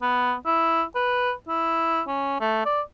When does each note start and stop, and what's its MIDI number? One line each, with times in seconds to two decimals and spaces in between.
0.02 0.35 59
0.46 0.83 64
0.95 1.33 71
1.48 2.01 64
2.07 2.35 61
2.40 2.65 57
2.65 2.81 74